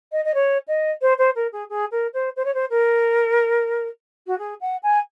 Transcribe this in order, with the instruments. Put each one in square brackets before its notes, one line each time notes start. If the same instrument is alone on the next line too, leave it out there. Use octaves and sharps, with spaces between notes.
[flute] D#5
D#5
C#5
D#5
C5
C5
A#4
G#4
G#4
A#4
C5
C5
C#5
C5
A#4
F#4
G#4
F#5
G#5